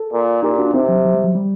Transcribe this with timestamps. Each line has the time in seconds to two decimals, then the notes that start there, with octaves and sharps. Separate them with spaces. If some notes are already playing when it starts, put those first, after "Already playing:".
Already playing: A4
0.13 A#2
0.43 A#2 D#4 G4
0.59 D4 F#4
0.74 C3 C4 D#4
0.89 F#3
1.05 F#3
1.15 G3
1.24 F#3
1.35 G3